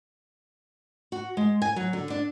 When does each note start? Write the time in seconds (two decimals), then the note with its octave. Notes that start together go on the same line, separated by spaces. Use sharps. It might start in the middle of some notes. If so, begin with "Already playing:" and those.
1.12 F#4
1.37 G#3
1.62 G#5
1.76 F#3
1.93 D3
2.10 D4